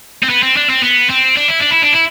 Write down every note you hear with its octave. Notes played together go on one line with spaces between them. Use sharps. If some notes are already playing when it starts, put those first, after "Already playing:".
C4
B3
C4
D4
C4
B3
C4
D4
E4
D4
E4
D4
E4